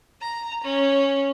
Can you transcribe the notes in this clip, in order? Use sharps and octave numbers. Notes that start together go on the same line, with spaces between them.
A#5
C#4